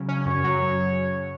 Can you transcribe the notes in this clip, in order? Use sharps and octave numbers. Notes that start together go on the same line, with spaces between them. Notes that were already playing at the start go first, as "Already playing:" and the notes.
Already playing: C#3 F#3
C#4
F#2 C#5
F#3